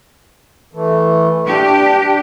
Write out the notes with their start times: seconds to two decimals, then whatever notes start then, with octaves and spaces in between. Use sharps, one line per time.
0.74 E3 A3
1.48 D4 G4